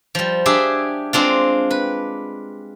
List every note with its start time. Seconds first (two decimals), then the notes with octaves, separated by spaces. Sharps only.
0.15 F3 G3
0.46 D4 G4 G#4 E5
1.13 G#3 C4 D4 F4
1.70 B4